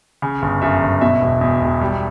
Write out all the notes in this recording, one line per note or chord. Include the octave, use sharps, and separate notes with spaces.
C#3
G1
F#2 E5
G1
B2 E5
E1
E2
E1
G3